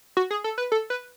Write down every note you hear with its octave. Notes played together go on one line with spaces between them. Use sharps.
F#4
G#4
A4
B4
A4
B4